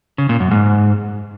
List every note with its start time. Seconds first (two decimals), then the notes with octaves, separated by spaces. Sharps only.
0.18 C#3
0.29 A#2
0.40 F#2
0.51 G#2